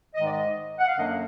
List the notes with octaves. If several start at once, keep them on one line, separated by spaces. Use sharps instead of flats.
G#2 D#3 G#3 D#5
D5
D#5
F#5
F5
F#2 D3 F#3 A#3 D4 D#5